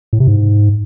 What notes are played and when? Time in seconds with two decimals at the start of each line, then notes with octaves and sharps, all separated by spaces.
0.13 A2
0.20 C3
0.27 G#2